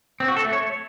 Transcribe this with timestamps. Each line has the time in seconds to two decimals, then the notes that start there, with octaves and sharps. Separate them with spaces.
0.20 C4
0.28 F#4
0.37 A4
0.45 A3
0.53 C#5